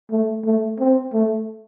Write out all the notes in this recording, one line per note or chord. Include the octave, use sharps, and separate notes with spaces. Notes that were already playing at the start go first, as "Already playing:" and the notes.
A3
A3
C4
A3